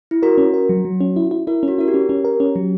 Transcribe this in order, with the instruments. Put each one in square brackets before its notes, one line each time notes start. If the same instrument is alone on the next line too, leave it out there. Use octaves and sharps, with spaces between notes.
[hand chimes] E4
[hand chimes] F#4 [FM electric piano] A#4
[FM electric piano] C#4
A#4
F#3
F#3
C#4
E4
E4
[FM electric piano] E4 [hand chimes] A#4
[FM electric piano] C#4 [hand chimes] F#4
[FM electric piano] E4 [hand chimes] A#4
[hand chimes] G4
[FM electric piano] C#4
C#4
A#4
C#4
F#3